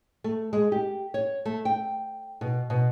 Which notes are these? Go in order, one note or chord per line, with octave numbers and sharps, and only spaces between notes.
A3
G#3
G4
C#5
A3
G5
B2
B2